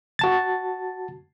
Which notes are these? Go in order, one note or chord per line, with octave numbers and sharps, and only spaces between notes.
F#4 A5 A6